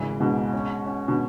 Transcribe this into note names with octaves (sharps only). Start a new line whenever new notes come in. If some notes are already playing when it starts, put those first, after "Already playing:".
Already playing: G#1 C#3 E3
G#2 B2
C#4
C#4
B2